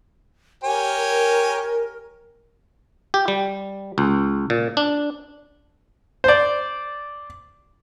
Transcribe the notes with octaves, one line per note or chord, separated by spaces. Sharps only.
G4 A#4 C#5 G#5
G4
G3
C#2
A#2
D4
C5 D5